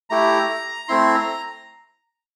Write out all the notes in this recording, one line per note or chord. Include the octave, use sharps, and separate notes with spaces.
A3 E4 G4 A#5
A3 C4 E4 C6
A#5